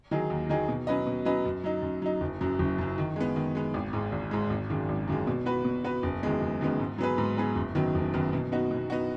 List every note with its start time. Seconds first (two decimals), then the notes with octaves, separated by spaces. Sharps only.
0.11 D#3 F#3 D#4 G#4
0.30 D#2
0.49 D#3 F#3 D#4 G#4
0.68 B2
0.87 F#3 C#4 B4 D#5
1.07 B2
1.25 F#3 C#4 B4 D#5
1.45 F#2
1.64 F#3 D#4
1.82 F#2
2.02 F#3 D#4
2.21 F#1
2.41 F#2 F#3
2.59 F#1
2.78 F#2 F#3
2.98 D#3
3.16 G#3 B3
3.36 D#3
3.55 G#3 B3
3.74 G#1
3.93 G#2 G#3
4.12 G#1
4.31 G#2 G#3
4.50 G#1
4.69 F#2 D#3 G#3
4.89 G#1
5.08 F#2 D#3 G#3
5.27 B2
5.46 B3 F#4 B4
5.65 B2
5.84 B3 F#4 B4
6.03 F#1
6.23 F#2 D#3 G#3 B3
6.41 F#1
6.61 F#2 D#3 G#3 B3
6.79 G#2
6.98 F#3 B3 G#4 B4
7.18 G#2
7.37 F#3 B3 G#4 B4
7.56 F#1
7.75 F#2 D#3 F#3 B3
7.95 F#1
8.14 F#2 D#3 F#3 B3
8.33 B2
8.52 B3 D#4 F#4
8.71 B2
8.90 B3 D#4 F#4